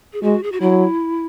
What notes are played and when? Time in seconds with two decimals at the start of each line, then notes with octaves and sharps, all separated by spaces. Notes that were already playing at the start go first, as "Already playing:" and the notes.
0.13 G#4
0.22 G#3 F#4
0.43 G#4
0.52 F#4
0.61 F#3 E4